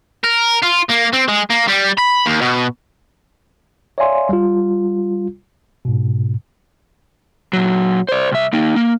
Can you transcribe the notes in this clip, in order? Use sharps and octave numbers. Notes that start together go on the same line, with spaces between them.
A#4
F4
A#3
C4
G#3
A#3
G3
B5
D#2
B2
C#5 D5 E5 F5 G#5 C6
G3 F4
G#2 B2
A#2 F#3
C5 D5
C2 E5
A#3 D#4
A#3